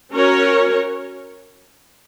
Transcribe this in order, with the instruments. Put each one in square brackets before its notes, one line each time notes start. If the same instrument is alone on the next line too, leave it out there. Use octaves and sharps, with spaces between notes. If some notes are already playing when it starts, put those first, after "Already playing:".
[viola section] C#4 F#4 A#4 C#5